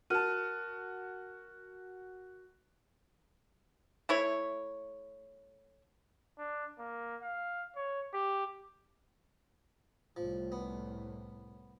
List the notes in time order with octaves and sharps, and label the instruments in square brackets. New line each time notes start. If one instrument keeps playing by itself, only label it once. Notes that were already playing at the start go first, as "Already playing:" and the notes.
[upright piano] F#4 A5 [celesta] A#4 F6 D#7
[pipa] A3 E4 C#5
[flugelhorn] D4
A#3
F5
C#5
G4
[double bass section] C2 A2 [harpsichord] F3
[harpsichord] B3